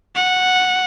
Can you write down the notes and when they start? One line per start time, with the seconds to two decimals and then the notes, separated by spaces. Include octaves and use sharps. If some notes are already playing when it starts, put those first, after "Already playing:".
0.15 F#5